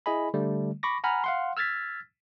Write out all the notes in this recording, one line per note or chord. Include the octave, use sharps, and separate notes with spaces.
E4 G#4 D#5 G#5 B5
D3 G3 A3
B5 C#6 D6 A#6
F#5 G#5 A#5 B5 F6
F5 F#5 C6
E6 F6 G#6 A6 B6